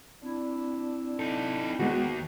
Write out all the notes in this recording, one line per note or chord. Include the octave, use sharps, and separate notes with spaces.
C4 D4 E4
D#4 A4
D#2 G#3 B3 F#4